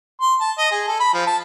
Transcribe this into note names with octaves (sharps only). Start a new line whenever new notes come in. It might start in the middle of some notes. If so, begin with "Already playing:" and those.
C6
A5
D#5
G#4
A4
B5
F3
A5